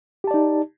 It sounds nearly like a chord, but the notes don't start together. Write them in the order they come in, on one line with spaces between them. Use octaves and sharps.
G4 A5 D5 D#4